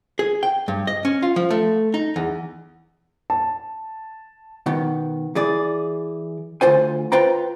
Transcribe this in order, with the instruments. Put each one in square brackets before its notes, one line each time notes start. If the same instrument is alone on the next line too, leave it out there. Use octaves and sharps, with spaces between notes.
[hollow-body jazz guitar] G#4
G5
G2
D#5
C#4
F4
F3
A3
D#4
E2
[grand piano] A5
[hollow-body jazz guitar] B2 D#3 B3
E3 G#4 D5
D2 F4 C5 G#5
F4 B4 C5 G5 A#5